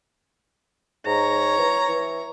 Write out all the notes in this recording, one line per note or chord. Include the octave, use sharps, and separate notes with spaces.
G#2 C#5 A#5
E3
E3